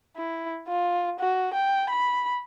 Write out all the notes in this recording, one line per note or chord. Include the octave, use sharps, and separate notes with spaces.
E4
F4
F#4
G5
B5